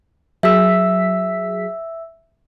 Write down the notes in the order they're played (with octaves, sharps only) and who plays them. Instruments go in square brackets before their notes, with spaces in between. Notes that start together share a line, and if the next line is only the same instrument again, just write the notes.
[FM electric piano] F#3 G#4 B6 [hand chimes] E5 E6